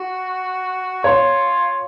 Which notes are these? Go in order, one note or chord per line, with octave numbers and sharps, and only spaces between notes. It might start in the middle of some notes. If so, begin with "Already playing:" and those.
Already playing: F#4
F4 C#5